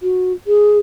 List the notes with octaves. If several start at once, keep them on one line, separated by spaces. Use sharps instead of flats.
F#4
G#4